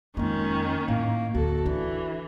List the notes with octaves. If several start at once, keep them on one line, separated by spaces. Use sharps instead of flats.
F2 D#3 G#3 A#3 C#4
A2 A#3
D1 D2 F#4 A4
E3 D4